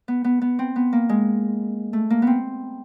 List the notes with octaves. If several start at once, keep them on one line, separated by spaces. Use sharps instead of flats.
B3
B3
B3
C4
B3
A#3
G#3
A3
A#3
B3 C4